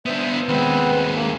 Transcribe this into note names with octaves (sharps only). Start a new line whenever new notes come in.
B3 D4 C5 E5 D#6
D#2 G#3 B3 C4 B4
A#3